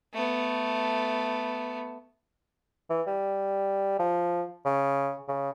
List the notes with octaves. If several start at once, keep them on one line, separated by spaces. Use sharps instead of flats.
A3 B3
E3
G3
F3
C#3
C#3